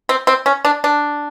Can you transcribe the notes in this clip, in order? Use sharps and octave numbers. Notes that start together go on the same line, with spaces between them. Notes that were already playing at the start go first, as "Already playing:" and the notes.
C4
C4
C#4
D4
D4